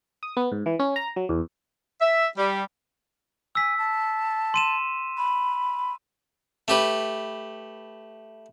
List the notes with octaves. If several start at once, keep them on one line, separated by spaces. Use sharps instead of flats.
D#6
B3
G#2
E3
C#4
A#5
F#3
E2
E5
G3
G#5 E6 B6
A5
C6 D#7 E7
B5
A3 G4 B4